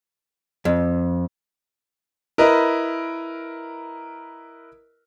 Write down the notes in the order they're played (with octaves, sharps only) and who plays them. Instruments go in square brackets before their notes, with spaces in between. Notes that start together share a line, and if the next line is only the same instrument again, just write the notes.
[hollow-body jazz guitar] F2
[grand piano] E4 A#4 B4 D#5